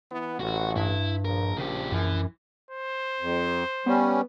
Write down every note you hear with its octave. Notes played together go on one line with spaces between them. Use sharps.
E3 B3
A1 F#4
G2 E4
A#1 A#4
C#3 G4
F#2 E3
C5
F2
G3 B3 C#4